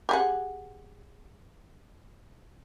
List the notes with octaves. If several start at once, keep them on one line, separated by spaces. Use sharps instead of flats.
G4 G#4 F#5